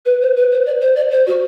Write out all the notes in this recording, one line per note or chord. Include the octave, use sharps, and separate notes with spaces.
B4
C5
B4
C5
D5
C5
D5
C5
F#4